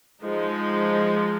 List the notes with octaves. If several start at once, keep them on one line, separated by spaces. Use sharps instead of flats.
F3 G#3 D#4